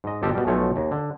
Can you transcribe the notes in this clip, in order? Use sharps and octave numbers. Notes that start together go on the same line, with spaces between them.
G#2 D#5
G1 F4 G4 A4 D#5
B2 G3
B1 F3 A3 C#5 G#5
D#2
D3